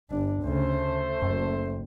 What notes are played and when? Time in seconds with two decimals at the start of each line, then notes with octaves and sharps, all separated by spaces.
0.10 G1 D4
0.43 D2 C#3 A3 C5
1.22 F#1 F#2